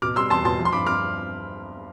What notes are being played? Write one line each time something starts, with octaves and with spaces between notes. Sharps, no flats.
B2 D6 F6
G3 C6 E6
E2 A5 C6
B2 A5 C6
F3
C6
G2 B5 D6
D6 F6